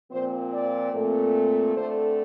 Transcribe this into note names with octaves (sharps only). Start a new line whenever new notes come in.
A#2 F3 C4 C5
D5
A#2 A3 C4
D3 A3 C4 C5